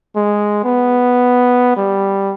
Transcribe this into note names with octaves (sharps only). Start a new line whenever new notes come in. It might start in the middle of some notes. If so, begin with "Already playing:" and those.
G#3
B3
G3